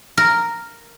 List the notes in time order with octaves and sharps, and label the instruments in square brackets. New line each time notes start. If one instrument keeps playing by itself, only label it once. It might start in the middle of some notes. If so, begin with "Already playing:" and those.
[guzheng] A#4